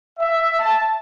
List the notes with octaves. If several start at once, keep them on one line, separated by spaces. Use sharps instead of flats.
E5
A5